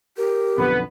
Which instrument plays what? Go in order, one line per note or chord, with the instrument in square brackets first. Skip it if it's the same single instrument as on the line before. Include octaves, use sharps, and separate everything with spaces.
[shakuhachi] G4 [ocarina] A#4
[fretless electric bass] B1 F2 D3 [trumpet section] B3 B4